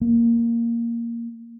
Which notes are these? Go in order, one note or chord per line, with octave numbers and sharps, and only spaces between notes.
A#3